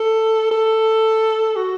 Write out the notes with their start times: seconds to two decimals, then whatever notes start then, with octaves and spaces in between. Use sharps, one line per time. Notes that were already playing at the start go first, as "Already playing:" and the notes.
Already playing: A4
0.51 A4
1.56 F#4